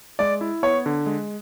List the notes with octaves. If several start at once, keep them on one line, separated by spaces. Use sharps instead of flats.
G#3 D5
E4
B3 C#5
D3
G#3